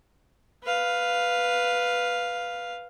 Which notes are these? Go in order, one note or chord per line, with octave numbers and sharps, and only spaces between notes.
B4 F5